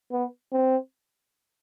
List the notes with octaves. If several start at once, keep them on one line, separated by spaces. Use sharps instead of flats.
B3
C4